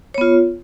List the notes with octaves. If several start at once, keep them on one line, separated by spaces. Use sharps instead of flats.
B3 F4 C#5